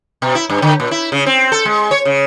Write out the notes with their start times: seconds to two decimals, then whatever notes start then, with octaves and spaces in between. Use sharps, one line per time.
0.22 B2
0.35 E4
0.49 G2
0.62 D3
0.80 A#2
0.91 E4
1.12 C#3
1.26 C4
1.52 A4
1.65 G#3
1.91 C#5
2.05 C#3